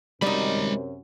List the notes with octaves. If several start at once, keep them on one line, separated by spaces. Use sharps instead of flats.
F#2 C3 G3 G#3 D#4 B5